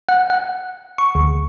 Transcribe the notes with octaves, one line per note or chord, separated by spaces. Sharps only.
F#5
F#5
C#6
D2